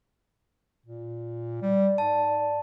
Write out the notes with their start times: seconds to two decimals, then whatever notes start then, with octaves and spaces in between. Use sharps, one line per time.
0.86 A#2
1.62 G3 D5
1.98 G#2 A5